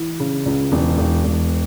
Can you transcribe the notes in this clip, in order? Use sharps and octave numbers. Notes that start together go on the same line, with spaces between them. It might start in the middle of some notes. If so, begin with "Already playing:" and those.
Already playing: E3
C#3
C#2
E1
E1
E1